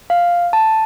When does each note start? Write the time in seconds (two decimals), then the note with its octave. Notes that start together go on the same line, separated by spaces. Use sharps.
0.10 F5
0.53 A5